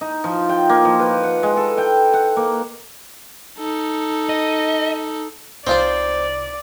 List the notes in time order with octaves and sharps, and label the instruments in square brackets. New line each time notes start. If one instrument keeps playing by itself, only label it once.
[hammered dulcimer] D#4
F3
G5
A#3
F3
B4
F#5
G#3
A4
G5
F#5
A#3
[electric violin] D#4 A4
[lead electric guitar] D#5
[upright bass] C2 C3 [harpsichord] C4 [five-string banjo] D#4 F4 C5 [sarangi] D5